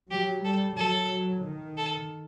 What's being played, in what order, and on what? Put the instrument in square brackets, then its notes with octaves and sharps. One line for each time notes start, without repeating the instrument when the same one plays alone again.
[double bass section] F#3 [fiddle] G4
[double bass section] G3 [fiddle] A4
[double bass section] F#3 [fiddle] A4
[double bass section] D#3
[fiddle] A4